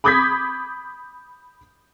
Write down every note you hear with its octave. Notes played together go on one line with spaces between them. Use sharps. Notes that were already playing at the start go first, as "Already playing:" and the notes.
B5 D6 D#6 G6 G#6 B6